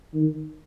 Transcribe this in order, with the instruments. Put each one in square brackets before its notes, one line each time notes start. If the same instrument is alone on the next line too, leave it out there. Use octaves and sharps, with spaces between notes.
[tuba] D#3